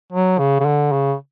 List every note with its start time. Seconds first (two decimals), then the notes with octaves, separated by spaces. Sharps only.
0.13 F#3
0.39 C#3
0.60 C#3
0.65 D3
0.92 C#3